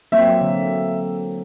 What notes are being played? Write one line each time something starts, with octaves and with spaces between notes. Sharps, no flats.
F#3 A#3 C4 E5
D3